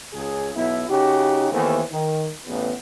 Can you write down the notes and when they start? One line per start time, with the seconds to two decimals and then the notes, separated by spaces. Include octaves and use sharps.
0.14 C#2 G#4
0.56 B1 B3 E4
0.90 C#3 D#4 F#4 G4
1.51 D#2 E3 A3 B3 C4
1.91 D#3
2.47 A1 E2 B3